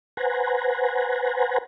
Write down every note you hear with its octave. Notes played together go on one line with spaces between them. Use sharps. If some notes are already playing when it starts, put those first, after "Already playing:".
B4 C5 F#5 G#5 A#5